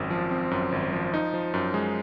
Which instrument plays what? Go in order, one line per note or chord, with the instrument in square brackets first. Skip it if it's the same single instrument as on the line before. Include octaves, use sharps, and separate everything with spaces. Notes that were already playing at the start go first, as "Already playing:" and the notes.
Already playing: [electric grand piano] G#1 F#2 C4
F3
C4
F#2
G#1
F3
D#4
F3
F#2
G#3